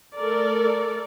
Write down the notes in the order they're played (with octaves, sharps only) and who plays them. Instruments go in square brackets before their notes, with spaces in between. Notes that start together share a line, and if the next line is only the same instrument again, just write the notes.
[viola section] A3 A4 A#4 D5